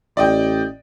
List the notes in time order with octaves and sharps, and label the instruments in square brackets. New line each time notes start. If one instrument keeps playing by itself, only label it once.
[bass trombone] A1 [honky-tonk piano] D5 D#5 G5